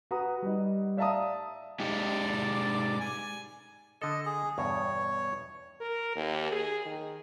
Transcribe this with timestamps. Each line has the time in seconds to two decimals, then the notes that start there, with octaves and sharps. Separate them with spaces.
0.11 F#4 B4 F#5 A#5 D#6
0.42 G3 D#4
0.97 D5 E5 F5 A5 A#5 D#6
1.80 G#3 D#4 G4 D5
3.00 G#5
4.02 D3 A4 D#5
4.25 G#4
4.58 E2 G2 B2 C#5
5.80 A#4
6.16 D#2
6.52 G#4
6.86 D#3